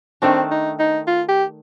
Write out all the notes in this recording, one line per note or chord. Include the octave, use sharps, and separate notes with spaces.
D#3 A3 C4 D4
D#4
D#4
F4
G4